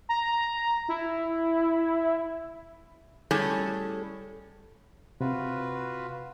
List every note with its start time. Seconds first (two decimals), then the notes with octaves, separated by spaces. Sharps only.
0.09 A#5
0.89 E4
3.31 A2 G3 C#4 G#4 A4
5.21 C3 F4 F#4 B4